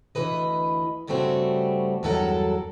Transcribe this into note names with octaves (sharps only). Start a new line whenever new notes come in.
D2 E3 B4 D#5
G2 C#3 G3 A3 C4 F#4
E2 G2 F#3 A4 A#4 F#5